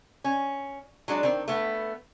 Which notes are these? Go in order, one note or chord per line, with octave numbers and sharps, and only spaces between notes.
C#4
F#3 G#3 D4
D#3 C4
A3 B3